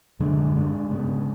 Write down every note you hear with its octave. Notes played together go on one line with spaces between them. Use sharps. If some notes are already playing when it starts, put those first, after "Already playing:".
F#2 D3 G#3 D4
G#2 G#3 D4
C#3 G#3 B3